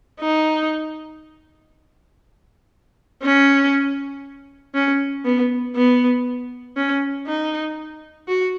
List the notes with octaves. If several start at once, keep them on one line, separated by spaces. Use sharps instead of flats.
D#4
C#4
C#4
B3
B3
C#4
D#4
F#4